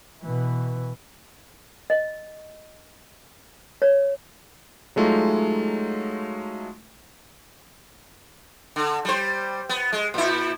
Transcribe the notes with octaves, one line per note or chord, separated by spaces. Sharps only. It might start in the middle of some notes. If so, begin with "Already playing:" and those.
B2 E3
D#5
C#5
F#3 G#3 A3 D#4 F4
D3
G3 C5
B3
G#3
A#2 E4